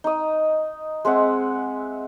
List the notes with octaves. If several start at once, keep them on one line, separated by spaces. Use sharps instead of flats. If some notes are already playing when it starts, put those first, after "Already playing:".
D#4 D#6
G#3 C4 E5 F#5